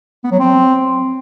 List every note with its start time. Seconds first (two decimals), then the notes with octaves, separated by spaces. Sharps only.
0.24 B3
0.31 F#3
0.39 C4